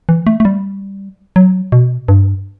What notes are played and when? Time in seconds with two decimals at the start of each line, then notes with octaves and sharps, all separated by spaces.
0.09 E3
0.27 A3
0.40 A3
0.45 G3
1.36 F#3
1.72 B2
2.08 G2